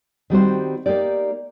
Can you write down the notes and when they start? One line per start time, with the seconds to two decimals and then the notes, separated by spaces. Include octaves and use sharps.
0.30 D#3 G3 C4 F#4 C5
0.86 A#3 D#4 G4 D5